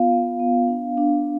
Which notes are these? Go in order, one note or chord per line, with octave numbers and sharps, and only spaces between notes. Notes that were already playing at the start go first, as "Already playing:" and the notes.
Already playing: B3 F4 F5
B3
B3
D4
D4